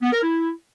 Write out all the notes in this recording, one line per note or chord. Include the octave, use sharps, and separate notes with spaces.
B3
A#4
E4